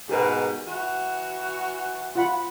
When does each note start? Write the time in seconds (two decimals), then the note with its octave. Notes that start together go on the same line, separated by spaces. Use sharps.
0.09 G#2 B2 D#4 G4 A#4 B4
0.65 E3 F#4
2.16 F4 F#5 B5